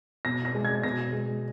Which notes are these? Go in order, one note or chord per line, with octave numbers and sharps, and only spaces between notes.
B2 A#6
A#6
G#3
G#6
B2 A#6
G#3